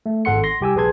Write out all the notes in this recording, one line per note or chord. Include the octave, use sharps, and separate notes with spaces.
A3
G#1 A4 F#5 C6 C#7
C6 A#6
C2 G4 G#5 E6
A#1 G#4 B4 A5 C6 G#6